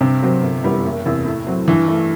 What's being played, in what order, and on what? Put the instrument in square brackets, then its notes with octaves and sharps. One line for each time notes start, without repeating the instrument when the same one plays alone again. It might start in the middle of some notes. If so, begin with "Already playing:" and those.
[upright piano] G2 [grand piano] C3
[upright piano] F#3 C4 F#4
G1
F#2 E3 G3 B3
F#1
E2 C3
A2
F#3 C4
[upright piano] G2 [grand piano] E3
[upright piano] E3 A3